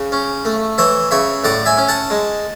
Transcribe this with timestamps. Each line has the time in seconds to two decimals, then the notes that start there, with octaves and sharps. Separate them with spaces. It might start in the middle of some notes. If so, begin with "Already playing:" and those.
Already playing: C#3
0.12 C#4
0.45 A3
0.78 E3 C#5 E5
1.11 C#3 C#5 E5
1.44 A2 D5 F#5
1.66 E5 G#5
1.78 C#4
1.88 F#5 A5
2.10 G#3